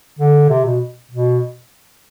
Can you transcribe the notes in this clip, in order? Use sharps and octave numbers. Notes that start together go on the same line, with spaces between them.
D3
C3
B2
B2